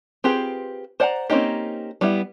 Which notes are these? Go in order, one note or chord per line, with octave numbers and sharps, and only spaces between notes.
C4 F4 G4 G#4 B4
C5 D5 F#5 A5 A#5
A#3 C4 C#4 D#4 G4
G3 B3 E4